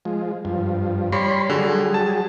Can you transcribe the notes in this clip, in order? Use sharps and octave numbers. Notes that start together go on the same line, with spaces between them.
F3 G#3
G2 F3
G3 C#5 B5 C6
D3 F#3 G3 G#4
A5